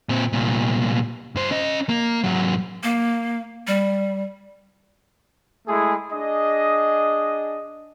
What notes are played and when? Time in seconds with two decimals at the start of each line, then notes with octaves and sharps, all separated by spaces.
0.09 A#2 C4
0.33 C2 A#2
1.35 G2 C5
1.51 C#4 D#5
1.89 A#3
2.23 G#2 F#3
2.83 A#3
3.67 G3
5.67 G#3 A3 E4 G#4
6.12 D4 G#4 D#5